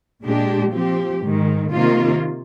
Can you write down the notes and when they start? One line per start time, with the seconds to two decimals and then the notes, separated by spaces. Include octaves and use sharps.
0.23 A#2 G#3 D4 G4
0.73 F3 C4 G4
1.22 G#2 D#3 G#3
1.72 C3 D#3 A#3 F4